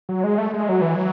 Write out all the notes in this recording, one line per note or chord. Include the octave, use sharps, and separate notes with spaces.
F#3
G#3
A3
G#3
F#3
E3
F#3